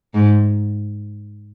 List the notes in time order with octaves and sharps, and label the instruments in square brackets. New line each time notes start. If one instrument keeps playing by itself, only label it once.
[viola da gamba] G#2